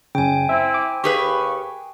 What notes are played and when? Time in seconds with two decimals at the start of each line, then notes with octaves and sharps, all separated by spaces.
0.15 F#2 C#3 G5 G#5
0.49 C4 E4 E5
0.74 D6
1.04 D#2 G4 G#4 B4 F5 C#6